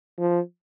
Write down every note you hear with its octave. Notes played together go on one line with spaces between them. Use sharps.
F3